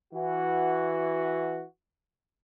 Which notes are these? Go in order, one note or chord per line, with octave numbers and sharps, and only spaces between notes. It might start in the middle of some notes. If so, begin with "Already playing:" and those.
E3 F#4